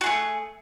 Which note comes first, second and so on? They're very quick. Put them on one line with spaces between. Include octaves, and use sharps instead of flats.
F#4 G#4 A3